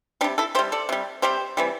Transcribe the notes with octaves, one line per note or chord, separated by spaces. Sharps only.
C3 G3 D4 G4
E4 A4
C3 G3 G4 C5
A4 D5
C3 G3
C3 G3 G4 C5
C3 E3 G3